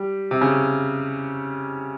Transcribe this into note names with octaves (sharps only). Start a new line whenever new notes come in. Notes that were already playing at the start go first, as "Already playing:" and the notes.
Already playing: G3
C3
C#3